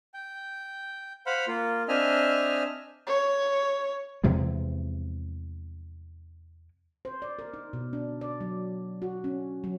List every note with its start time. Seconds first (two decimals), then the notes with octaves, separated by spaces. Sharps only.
0.14 G5
1.26 C5 F5 F#5 B5
1.48 A#3 F4
1.88 C4 D4 D#5 E5 G#5 F6
3.07 C#5
4.24 E2 C3 F3 G#3
7.05 C5
7.22 D5
7.39 A#4
7.54 D#4
7.73 B2
7.93 D4
8.21 D5
8.41 F#3
9.02 F#4
9.24 C#4
9.64 F#3